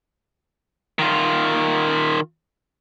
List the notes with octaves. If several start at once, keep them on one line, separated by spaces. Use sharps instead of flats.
D#3 F4